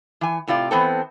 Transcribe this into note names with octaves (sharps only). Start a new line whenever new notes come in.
E3 G#5
A2 C3 F4 D5
E3 B3 C4 A4